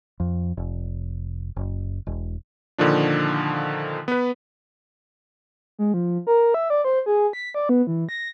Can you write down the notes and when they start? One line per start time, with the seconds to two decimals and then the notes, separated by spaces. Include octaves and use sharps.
0.20 F2
0.57 F1
1.56 F#1
2.06 E1
2.78 A#2 D3 D#3 F3 D4
4.08 B3 B4
5.79 G#3
5.94 F3
6.27 A#4
6.54 E5
6.70 D5
6.85 C5
7.06 G#4
7.33 B6
7.54 D5
7.69 B3
7.87 E3
8.09 A#6